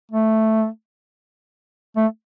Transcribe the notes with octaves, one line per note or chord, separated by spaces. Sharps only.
A3
A3